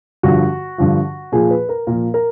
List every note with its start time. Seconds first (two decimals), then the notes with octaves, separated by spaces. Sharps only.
0.23 G2 D3 F3 F#4
0.78 G2 D3 F3
1.32 A#2 F3 G#4
1.51 B4
1.69 A#4
1.87 A#2 F3 A#4
2.14 A#4